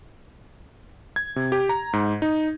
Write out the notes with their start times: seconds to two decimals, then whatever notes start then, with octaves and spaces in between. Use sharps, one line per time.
1.16 G#6
1.36 C3
1.52 G4
1.69 A#5
1.93 G#2
2.22 D#4